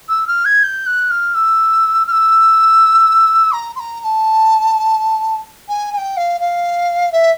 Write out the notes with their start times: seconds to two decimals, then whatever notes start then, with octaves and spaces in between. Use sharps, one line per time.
0.08 E6
0.27 F6
0.45 G#6
0.63 G6
0.86 F#6
1.10 F6
1.34 E6
2.07 F6
2.11 E6
3.52 A#5
3.75 C6
3.79 A#5
4.00 A#5
4.04 A5
5.68 G#5
5.92 G#5
5.97 G5
6.17 F5
6.40 F5
7.12 E5